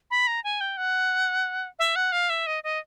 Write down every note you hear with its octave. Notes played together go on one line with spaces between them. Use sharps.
B5
A#5
G#5
G5
F#5
E5
F#5
F5
E5
D#5
D#5